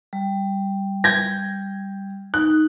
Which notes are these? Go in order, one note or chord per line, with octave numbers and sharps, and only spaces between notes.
G3
G6 G#6 A#6
D#4 F#6